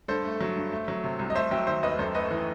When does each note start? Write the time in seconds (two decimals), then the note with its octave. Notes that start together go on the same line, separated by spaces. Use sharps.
0.08 G2 A4 C5
0.25 A3
0.41 F#3
0.56 G2
0.72 A3
0.88 F#3
1.04 C3
1.19 C2
1.30 D#5
1.35 A3 C5 E5
1.51 F#3 E5 G5
1.67 D#3 C5 E5
1.83 D#2 B4 D#5
1.99 F#2 A4 C5
2.15 A3 B4 D#5
2.31 E3